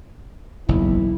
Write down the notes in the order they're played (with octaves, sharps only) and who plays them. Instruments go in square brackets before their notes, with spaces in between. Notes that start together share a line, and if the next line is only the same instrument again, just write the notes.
[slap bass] F#1 B1 E2 [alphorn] E4